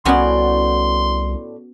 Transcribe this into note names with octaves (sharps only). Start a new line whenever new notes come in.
C2 A2 B3 C#4 F#4 D5 C6